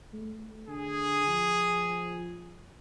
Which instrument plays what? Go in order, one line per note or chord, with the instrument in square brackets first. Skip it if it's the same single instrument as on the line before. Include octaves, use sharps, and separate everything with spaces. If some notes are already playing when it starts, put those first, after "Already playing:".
[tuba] A3
[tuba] D3 [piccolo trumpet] G#4
[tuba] F3